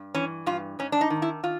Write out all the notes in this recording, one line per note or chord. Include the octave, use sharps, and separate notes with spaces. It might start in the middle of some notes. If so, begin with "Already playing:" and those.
Already playing: G2
E3 C#4
G2 F4
G#2 C#4
D4
D#4
D#3
E4
D#3 F4